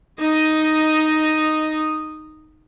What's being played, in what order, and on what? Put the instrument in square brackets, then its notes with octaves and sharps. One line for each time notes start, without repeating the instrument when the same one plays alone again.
[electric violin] D#4 D#5